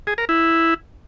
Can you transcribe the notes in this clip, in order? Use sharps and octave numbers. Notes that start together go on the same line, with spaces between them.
G#4
A#4
E4